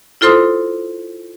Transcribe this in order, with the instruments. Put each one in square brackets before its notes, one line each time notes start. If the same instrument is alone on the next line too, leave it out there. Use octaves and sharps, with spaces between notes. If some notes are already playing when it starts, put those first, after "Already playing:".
[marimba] E4 F4 A4 C5 C6 D#6